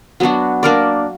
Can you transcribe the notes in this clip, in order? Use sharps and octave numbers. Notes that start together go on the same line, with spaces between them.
F#3 B3 D4 F#4
A#3 D4 A#4 D5